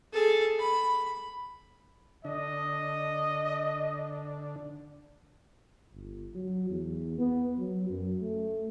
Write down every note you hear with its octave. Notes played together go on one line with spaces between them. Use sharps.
G#4 A4
B5
D3 D4 D#5
G1
F#3
E2
B3
F#3
F#2
A3